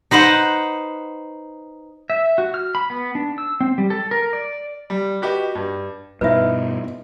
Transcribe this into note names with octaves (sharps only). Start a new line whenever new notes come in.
D#4 B4 C5 F#5
E5
F#4
F6
B5
B3
D4
E6
C4
G3
A4
A#4
D5
G3
F#4 G4 B4 D#5
G2
G2 B2 D#4 E4 B4 E5